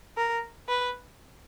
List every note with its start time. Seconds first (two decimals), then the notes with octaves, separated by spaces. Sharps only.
0.17 A#4
0.69 B4